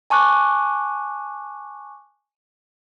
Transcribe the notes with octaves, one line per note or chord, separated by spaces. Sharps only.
G#5 A5 C#6 D6 F#6